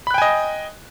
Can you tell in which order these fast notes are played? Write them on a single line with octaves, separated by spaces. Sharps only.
B5 F#6 G5 G#5 D#5